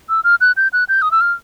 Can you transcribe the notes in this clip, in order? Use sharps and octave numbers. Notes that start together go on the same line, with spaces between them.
E6
F6
F#6
G6
F#6
G6
D#6
E6
F6